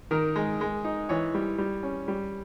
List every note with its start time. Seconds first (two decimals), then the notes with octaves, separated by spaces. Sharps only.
0.11 D#3 A#4
0.36 G#3
0.61 G#3
0.84 D#4
1.09 E3 C#5
1.34 G3
1.58 G3
1.83 C#4
2.08 G3